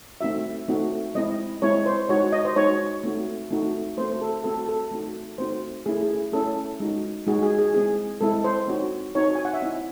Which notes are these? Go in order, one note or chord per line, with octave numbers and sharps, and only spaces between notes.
A3 C4 D#4 F#4 E5
A3 C4 D#4 F#4
G#3 C4 E4 D#5
G#3 C4 E4 C#5
C5
G#3 D#4 F#4 C#5
D#5
C5
G#3 D#4 F#4 C#5
A3 C4 D#4 F#4
A3 C4 D#4 F#4
A3 C4 F#4 C5
A4
A3 C4 F#4 A4
A4
A3 C4 D#4 F#4
A3 C4 D#4 F#4 C5
A3 C#4 E4 G#4
G#4
A3 C#4 E4 A4
G#3 D#4 F#4
G#3 D#4 F#4 G#4
G#4
G#4
G#3 C4 E4 G#4
G#3 C4 E4 A4
C5
C4 D#4 F#4 C#5
C4 D#4 F#4 C#5
G#5
F#5
E5
C4 E4 D#5